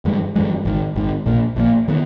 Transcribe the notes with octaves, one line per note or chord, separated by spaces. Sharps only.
G2 E3 G#3
G2 E3 G#3
G#1 G#2 D#3
G#1 G#2 D#3
A#1 A#2 A#3
A#1 A#2 A#3
D#3 G#3 B3